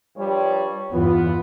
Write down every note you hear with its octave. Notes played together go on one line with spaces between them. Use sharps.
G2 F3 G3 C#5
E2 G2 E3 B3 F4